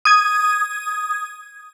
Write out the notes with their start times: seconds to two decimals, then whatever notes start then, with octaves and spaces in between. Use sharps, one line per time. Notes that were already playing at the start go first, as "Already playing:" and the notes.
0.05 D#6 G#6